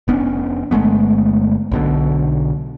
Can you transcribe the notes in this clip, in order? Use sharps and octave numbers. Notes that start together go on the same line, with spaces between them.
F1 B3 C#4 D4
G1 G#3 A3 B3
B1 B2 D3